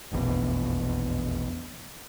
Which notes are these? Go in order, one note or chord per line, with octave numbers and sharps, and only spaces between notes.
F1 A#1 E2 B2